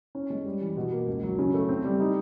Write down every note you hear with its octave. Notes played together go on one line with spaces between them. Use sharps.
C#4
G#3
G3
E3
B2
A#3
C#2
F#3
C#3
A3
C4
G3
D#4